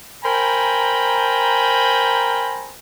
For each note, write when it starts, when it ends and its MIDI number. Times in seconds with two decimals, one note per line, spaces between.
0.24 2.74 70
0.24 2.74 72
0.24 2.74 79
0.24 2.74 80
0.24 2.74 82
0.24 2.74 83